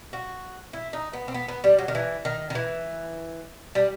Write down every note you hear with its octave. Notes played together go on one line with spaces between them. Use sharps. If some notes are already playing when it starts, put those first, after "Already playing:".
F#4
E4
D#4
B3
C4
B3
B3
G3
F#3
D#3
E3
D#3
D#3
E3
G3